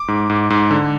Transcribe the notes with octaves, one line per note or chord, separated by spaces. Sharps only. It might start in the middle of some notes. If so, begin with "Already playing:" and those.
Already playing: D6
G#2
G#2
G#2
D3